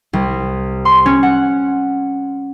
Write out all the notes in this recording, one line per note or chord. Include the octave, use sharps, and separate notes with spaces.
C2
C6
C#4
F#5